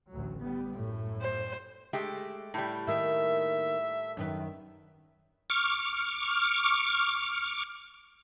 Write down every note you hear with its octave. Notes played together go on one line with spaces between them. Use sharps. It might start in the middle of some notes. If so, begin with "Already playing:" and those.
A1 D2 F#3
G3 B3
F#2 A2 A3
C5
G#3 A3 G4
A2 G3
D#3 A#3 E5
F#2 D#3 B4
C#6 D6 F6